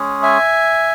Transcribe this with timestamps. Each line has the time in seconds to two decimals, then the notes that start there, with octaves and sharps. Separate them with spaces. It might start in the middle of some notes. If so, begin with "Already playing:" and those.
Already playing: G#3 C#4 G#4
0.22 E5 G#5